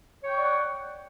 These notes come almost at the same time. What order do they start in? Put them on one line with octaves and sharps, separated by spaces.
C#5 G5 C#6 D5 F#5